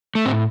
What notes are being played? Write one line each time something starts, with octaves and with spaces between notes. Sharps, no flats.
A3
A2 C4